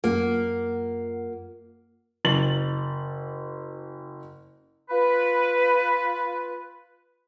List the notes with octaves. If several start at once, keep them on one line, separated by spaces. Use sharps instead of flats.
F#2 A#3 F4 F#5
F#1 A6 F#7
F4 B4